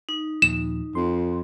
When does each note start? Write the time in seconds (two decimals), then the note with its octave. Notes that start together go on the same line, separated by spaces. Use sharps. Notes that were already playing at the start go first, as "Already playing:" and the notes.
0.09 D#4
0.42 D#2 A#2 F3 E7
0.95 F2 C6